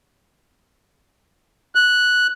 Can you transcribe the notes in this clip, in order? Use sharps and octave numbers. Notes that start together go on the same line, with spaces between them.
F#6